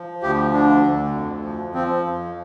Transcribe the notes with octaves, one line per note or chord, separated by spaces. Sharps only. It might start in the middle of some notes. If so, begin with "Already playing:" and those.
Already playing: F3
D2 G4
D3 D4
D2
F2
F3
F3 C4
F2